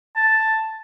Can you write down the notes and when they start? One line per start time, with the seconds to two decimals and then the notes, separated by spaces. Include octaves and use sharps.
0.16 A5